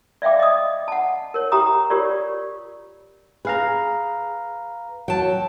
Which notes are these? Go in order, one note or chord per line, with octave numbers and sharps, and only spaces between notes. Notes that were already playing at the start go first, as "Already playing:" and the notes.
D5 E5 F5 G5 D6
D#5 D#6
F#5 A5
A#4 C#5
G4 G5 A#5 D#6
F4 G4 A#4 C#5 D5
G#4 B4 F5 A#5
F#3 G5 A5